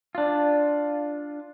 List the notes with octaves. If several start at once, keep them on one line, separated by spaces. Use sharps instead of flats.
D4 F4